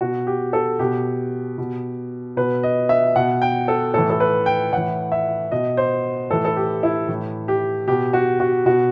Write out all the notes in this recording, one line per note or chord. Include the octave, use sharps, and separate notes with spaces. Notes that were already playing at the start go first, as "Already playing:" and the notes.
B2 F#4
G4
A4
B2 G4
B2
B2 B4
D#5
E5
B2 F#5
G5
A4
A2 E3 A4
A4
B4
G5
A2 E3 F#5
E5
B2 D#5
C5
A2 E3 A4
A4
G4
E4
A2 E3
G4
B2 G4
F#4
F#4
B2 F#4